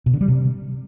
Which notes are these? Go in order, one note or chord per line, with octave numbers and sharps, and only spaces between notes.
B2
D3
G3
C3